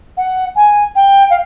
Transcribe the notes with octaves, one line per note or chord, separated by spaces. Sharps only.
F#5
G#5
G5
F5